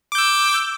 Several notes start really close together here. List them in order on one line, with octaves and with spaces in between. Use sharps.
D6 G6 E6